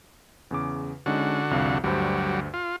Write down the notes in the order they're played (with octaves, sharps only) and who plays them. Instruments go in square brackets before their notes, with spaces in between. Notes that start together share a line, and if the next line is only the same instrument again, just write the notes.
[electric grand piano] E2 C#3 D6
[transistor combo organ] D3 F#4 [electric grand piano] G#3 C#4 D#4
[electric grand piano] C2 F2 F5
[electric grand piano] D2 G2 C5 [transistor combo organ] F#3 G3
[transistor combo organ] F4